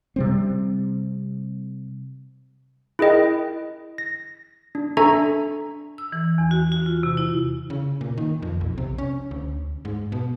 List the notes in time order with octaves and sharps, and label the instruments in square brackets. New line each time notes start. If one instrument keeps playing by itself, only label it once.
[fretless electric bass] C3 G3 C4
[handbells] E4 G#4 A#4 D#5 G5
A#6
D4
D4 A4 E5 G#5 A#5 C#6
[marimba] E6
E3
E2
F#4
F#4
F4
C3
E4
[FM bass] C#3
A#2
D#3
F2
B1
C3
C#4
D2
G#2
B2